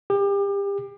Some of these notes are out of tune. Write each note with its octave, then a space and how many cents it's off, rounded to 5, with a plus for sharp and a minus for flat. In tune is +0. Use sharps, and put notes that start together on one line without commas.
G4 +30